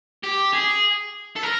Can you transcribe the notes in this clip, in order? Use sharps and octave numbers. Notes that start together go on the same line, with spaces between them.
G4
G#4
A4
A#4